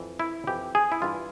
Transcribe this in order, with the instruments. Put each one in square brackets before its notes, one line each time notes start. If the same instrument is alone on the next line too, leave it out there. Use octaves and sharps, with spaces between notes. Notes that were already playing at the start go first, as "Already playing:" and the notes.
Already playing: [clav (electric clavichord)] F2 E3
E4
F2 E3 G4
G#4
E4
G2 E3 F4